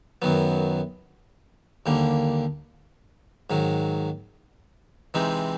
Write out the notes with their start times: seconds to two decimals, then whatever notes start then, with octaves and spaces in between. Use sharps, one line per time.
0.22 F#2 D#3 F#3 B3
1.86 D#2 D3 G3 A#3
3.50 G#2 D#3 F#3
5.14 C3 E3 G#3 C4 D#4